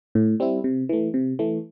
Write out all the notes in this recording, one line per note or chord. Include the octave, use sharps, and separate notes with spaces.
A2
G3 C4 E4
C3
E3 A3
C3
E3 A3